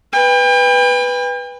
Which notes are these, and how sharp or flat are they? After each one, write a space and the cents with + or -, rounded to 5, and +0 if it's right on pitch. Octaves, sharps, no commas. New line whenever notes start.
B4 +0 G5 +40